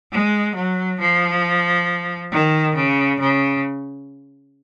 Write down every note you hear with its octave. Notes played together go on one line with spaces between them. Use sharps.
G#3
F#3
F3
D#3
C#3
C#3